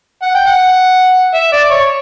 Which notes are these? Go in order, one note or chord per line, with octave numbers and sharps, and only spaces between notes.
F#5
G5
F#5
E5
D5
D5
C#5